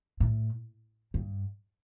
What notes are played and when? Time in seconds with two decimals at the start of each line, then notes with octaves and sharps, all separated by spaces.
0.20 A2
1.14 G2